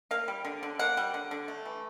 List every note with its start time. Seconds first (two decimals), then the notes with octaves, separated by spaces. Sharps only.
0.11 A#3 F5
0.28 G3
0.45 D3
0.63 D3
0.79 A#3 F#5
0.97 G3
1.14 D3
1.31 D3
1.48 A3
1.65 E3